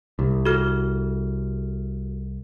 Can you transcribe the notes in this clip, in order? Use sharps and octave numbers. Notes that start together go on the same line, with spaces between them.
C2
F#4 A4 F6